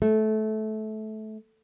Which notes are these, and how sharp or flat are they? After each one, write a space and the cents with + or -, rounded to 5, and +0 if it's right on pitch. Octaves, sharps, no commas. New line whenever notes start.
A3 -20